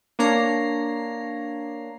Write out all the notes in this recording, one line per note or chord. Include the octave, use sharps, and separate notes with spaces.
A#3 D4 C#5 A#5 C7